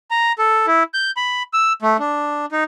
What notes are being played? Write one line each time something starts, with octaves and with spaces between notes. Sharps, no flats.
A#5
A4
E4
G6
B5
E6
A3
D4
D#4